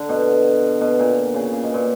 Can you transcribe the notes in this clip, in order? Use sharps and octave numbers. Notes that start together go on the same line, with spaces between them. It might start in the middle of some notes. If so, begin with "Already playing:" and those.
Already playing: D3
B2
B2
A#2
C#3
C#3
B2
A#2